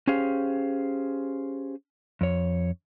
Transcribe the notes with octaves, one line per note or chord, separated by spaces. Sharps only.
C#4 G4 G#4 C5 F5
F2 C#5